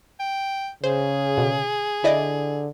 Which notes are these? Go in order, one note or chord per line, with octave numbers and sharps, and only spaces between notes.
G5
C#3 G#4 C5
B2 D3
D3 E4 D5 D#5